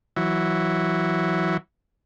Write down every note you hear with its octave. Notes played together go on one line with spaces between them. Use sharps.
E3 F#3